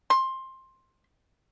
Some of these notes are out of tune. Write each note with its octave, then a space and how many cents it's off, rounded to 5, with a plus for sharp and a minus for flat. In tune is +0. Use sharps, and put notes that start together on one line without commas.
C6 +15